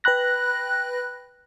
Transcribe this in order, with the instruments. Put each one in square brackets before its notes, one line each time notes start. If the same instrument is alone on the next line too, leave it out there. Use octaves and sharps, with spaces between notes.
[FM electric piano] B4 G5 B5 F#6 A#6